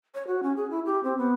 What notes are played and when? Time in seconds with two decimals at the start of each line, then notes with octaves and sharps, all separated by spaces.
0.15 C#5
0.27 F#4
0.43 C#4
0.56 G#4
0.71 E4
0.86 G4
1.03 C4
1.18 B3